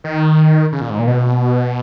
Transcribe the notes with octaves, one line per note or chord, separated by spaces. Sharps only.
D#3
C#3
A#2
G#2
A#2
B2